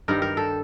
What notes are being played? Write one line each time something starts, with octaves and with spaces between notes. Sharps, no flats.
G2 D#3 G3 A#4
A#4
A4